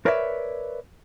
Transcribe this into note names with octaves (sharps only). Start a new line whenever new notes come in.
A#4 B4 C#5 D5 E5